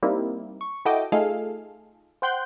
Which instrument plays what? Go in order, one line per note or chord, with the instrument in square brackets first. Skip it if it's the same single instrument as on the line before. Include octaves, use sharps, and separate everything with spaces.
[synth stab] G3 A#3 C4 D#4 E4
C#6
E4 F#4 A4 D#5 G5 D6
A3 D#4 F4 G#4 A4 F5
C5 F#5 G5 C6 F#6 G6